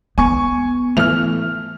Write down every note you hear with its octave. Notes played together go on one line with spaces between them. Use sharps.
B3 G#5 C#6
E3 A3 F6 F7